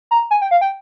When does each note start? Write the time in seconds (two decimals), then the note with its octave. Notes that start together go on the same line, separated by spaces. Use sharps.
0.11 A#5
0.31 G#5
0.42 G5
0.51 F5
0.61 G5